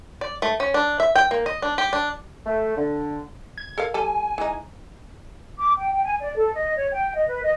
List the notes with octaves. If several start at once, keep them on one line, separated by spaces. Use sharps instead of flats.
D5
A3
C#4
D4
E5
G5
A#3
D#5
D4
G4
D4
A3
D3
G#6
A4 A#4 F5
G3 A4 G#5
E3 G#3 D#4
D6
G5
G5
G#5
D5
A4
D#5
C#5
G5
D#5
B4
D#5